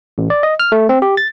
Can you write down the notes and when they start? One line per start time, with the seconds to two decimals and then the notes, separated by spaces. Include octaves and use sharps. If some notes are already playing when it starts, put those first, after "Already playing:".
0.18 A1
0.30 D5
0.43 D#5
0.60 F6
0.72 A3
0.89 C4
1.02 G4
1.17 A6